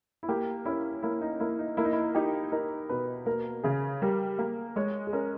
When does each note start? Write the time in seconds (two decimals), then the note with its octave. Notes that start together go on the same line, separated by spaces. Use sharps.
0.23 E4
0.28 A#3 G4
0.65 C#4 E4
1.03 A#3 E4
1.21 D#4
1.40 A#3 E4
1.59 D#4
1.77 A#3 E4
1.85 D#4
1.93 E4
2.15 D#4 G4
2.52 D#4 A#4
2.89 B2 B4
3.26 A#3 A#4
3.64 C#3 G#4
4.02 G3 A#4
4.38 A#3
4.76 G#3 C#5
5.07 G#4
5.13 C#4 A#4